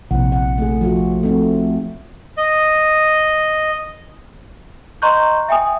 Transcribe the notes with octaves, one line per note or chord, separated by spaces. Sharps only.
A#1 C3 E4 F#5
F#5
A3 G#4
F3 F4 F#4
A3 C4 D#4
D#5
D#5 A#5 C6 C#6 F#6 G6
E5 G5 G#5 D#6